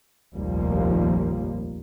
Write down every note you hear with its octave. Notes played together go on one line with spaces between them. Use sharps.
F1 A#1 D#2 F3 G3 A#3